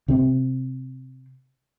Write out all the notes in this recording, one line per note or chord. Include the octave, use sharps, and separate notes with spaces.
C3 C4